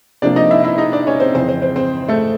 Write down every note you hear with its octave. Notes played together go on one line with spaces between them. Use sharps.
C3 F3 A#3 D4 D5
D#4 D#5
E4 E5
E4 E5
D#4 D#5
D4 D5
C#4 C#5
C4 C5
F2 C#3 E3 C4 C5
C4 C5
C4 C5
C4 C5
A3 A4